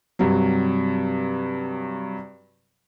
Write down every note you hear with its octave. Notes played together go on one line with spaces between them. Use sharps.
G2 C3 F#3